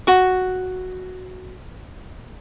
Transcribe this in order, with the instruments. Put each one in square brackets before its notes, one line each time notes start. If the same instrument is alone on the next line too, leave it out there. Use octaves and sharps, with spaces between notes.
[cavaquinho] F#4 C#6